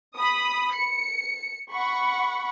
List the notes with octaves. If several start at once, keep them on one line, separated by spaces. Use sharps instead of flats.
B5 D#6
C#7
F#5 B5 C#6